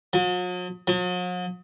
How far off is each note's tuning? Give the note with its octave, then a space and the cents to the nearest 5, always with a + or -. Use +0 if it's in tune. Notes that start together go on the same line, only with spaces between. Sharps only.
F#3 -45
F#3 -45